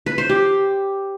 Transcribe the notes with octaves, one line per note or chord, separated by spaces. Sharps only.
B4
C5
G4